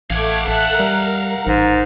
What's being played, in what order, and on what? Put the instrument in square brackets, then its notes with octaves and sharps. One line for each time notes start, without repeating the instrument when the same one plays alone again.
[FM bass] A1 [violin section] A3 D6 G#6 [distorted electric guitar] F5 F#5
[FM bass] A1 [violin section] A4 E5 F#6
[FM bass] G3 [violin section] A#4
[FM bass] A1 [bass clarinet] G#2